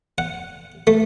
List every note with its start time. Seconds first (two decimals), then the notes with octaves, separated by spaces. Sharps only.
0.18 F#5
0.87 A3